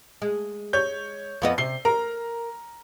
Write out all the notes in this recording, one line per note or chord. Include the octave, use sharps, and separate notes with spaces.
G#3
C#5 G6
F2 B3 D#5
C3 C7 G7
A#4 A#5